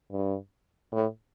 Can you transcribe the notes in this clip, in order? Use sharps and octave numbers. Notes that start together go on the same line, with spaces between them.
G2
A2